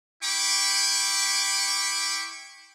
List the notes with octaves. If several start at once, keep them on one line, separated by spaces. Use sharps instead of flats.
E4 G5 B5 C#6 D6